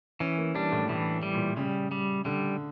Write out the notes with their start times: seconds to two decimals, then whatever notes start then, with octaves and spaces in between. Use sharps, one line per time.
0.20 E3 C#4
0.37 A#3
0.55 G3 D4
0.72 A2
0.89 A2 E3
1.23 G3
1.34 A#2
1.57 C#3 G3
1.92 G3
2.25 D3 G3